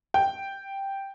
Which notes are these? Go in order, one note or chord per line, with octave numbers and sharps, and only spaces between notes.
G5